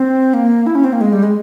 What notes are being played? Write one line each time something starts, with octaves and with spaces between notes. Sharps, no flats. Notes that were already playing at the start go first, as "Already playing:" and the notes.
Already playing: C4
A#3
E4
C#4
C4
A#3
G#3
G3
G#3